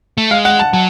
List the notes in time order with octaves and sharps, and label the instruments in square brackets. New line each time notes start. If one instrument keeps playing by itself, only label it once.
[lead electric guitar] A3
[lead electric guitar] G#3 [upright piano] F5
[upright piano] F#5
A5
[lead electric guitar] F#3 [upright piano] A5